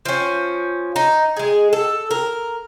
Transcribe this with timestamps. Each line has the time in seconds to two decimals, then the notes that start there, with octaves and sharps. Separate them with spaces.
0.05 F3 C#4
0.96 D#4
1.36 G#3 G#4
1.73 A4
2.11 A#4